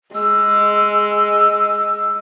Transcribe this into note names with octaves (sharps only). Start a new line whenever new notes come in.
G#3 E6